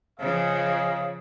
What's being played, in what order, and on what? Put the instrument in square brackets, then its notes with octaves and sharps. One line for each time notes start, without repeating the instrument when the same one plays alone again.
[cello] C#3 F3 [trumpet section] G#4 D#5 F5